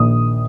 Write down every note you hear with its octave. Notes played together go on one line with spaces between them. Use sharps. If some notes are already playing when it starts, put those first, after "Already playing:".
Already playing: A#1 D#3 D#6